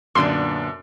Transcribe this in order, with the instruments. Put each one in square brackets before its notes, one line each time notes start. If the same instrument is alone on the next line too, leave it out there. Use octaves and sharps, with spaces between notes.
[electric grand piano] F#2 [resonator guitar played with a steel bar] A#2 D3 B3 [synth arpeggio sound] C6